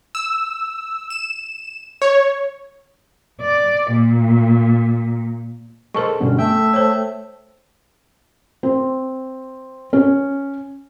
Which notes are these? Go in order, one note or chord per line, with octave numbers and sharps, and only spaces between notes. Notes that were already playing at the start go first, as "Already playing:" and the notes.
E6
E7
C#5
D5
A#2
G#3 A4 A#4 C5 C#6
G2 B2 D3 C#4
A3 E5 G5
C5 C#5
C4
C#4